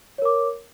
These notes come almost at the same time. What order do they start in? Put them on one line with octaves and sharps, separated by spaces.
C#5 A#4 D6